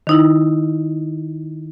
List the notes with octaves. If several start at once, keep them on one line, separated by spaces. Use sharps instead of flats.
D#3 D#4 E4